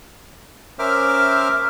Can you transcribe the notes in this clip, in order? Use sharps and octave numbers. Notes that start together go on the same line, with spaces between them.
C#4 A#4 C5 E5 D6 F6